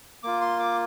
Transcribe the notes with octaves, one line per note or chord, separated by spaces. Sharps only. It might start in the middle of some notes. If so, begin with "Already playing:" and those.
A#3 F4 D6
C6
D6